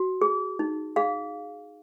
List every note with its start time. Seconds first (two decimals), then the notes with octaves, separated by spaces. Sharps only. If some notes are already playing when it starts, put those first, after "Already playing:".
Already playing: F#4
0.21 G#4
0.59 D#4
0.96 G#4 F5